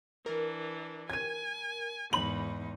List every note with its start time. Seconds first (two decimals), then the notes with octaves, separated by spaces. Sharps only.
0.26 E3 D4 A#4
1.10 G#5 G#6 D#7
2.13 E2 G#2 D#4 B5 F#7